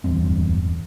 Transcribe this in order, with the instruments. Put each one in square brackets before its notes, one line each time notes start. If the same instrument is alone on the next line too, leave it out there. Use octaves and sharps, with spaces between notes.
[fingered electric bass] D1 E2 G2 C4